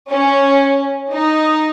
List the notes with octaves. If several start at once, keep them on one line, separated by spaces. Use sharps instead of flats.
C#4
D#4